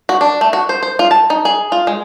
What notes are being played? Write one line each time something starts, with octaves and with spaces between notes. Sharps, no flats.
F#4
D4
A3
F#4
C5
C5
F4
A5
D#4
G#4
F4
G#3